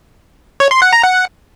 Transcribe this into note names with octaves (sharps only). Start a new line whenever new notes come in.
C#5
C6
F#5
A#5
F#5